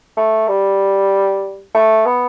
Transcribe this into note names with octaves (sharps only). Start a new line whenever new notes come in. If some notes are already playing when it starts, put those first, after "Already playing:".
A3
G3
A3
B3